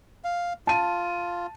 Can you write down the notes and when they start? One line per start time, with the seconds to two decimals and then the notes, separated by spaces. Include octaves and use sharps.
0.24 F5
0.67 F4 A5 D#7